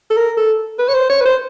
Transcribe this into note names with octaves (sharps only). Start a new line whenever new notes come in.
A4
A#4
A4
B4
C#5
C5
C#5
B4
C5